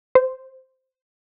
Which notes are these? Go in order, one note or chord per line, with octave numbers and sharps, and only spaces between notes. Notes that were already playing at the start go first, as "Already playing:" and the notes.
C5